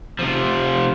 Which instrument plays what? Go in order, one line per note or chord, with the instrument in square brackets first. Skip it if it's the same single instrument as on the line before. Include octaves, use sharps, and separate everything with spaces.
[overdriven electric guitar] C3 F3